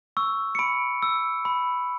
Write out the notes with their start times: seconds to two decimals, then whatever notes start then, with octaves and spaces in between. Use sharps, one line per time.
0.17 C#6 E6
0.55 C#7
0.59 B5 D7
1.02 E6
1.45 B5